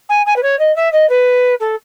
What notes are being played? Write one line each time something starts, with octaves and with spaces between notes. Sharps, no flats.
G#5
G#5
B4
C#5
D#5
E5
D#5
B4
A4